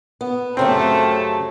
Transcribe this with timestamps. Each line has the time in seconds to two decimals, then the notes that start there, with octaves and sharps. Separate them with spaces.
0.21 B3
0.57 F#2 C#3 A3 C4 G4 A4